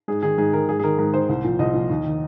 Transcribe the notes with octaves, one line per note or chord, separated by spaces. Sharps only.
G#2 G#4
D#3 G#4
G#2 G#4
D#3 A#4
G#2 G#4
G#4
D#3 A#4
G#2 A#4
D#3 C5
C2
A#2 F3
C2 D#5
A#2 F3
D#2
D#3